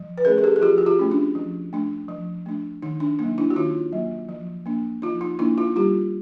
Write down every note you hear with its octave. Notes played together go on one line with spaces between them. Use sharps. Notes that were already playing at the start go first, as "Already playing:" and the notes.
Already playing: F3
B4
A3 C#4 G#4 A#4
G#4
G4 A4
G#4
F3 F4 G4
F#4
F4 G4
A3 C#4
D4
F3
A3 D4
F3
A3 D4
D#3 D#4
D4
F#3 A#3 D#4
D4 E4
F#4
D#3 D#4 F4
F#3 A#3
F3
A#3 D4
F3 D#4 F4
D#4
A#3 D4 E4
D#4 F4
G3 F4 G4